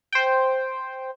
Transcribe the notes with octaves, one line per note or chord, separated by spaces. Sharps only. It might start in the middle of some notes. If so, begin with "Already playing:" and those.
C5 G5